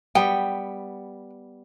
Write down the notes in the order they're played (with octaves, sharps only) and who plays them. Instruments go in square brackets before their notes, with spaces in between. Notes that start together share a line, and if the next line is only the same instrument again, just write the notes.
[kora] G3 B3 [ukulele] G5